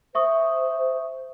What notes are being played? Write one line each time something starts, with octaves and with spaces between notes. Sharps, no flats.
C5 E5 C#6 D#6